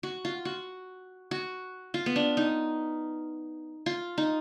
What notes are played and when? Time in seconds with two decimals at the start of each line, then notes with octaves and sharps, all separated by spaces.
0.03 F#4
0.25 F4
0.45 F#4
1.31 F#4
1.94 F4
2.06 B3
2.16 D4
2.37 D#4
3.86 F4
4.18 D#4